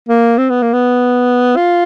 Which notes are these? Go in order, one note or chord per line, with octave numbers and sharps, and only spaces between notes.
A#3
C4
B3
A#3
B3
F4